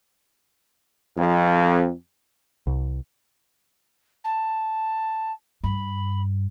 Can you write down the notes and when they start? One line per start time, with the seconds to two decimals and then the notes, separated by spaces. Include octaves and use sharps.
1.17 F2
2.67 C2
4.24 A5
5.64 G2 B5